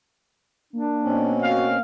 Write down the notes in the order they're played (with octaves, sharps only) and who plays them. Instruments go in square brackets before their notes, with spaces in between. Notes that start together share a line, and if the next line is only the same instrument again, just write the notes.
[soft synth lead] A#3 [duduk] D4
[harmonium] B2 C4 C#4
[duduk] F#4 [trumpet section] F5